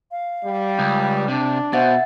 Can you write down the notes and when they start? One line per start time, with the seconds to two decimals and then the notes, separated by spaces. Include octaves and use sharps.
0.11 F5
0.44 G3
0.79 C#2
1.28 C3 D4
1.73 B2 C5 E5 F#5 A6